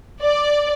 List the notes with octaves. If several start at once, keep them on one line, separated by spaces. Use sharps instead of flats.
D5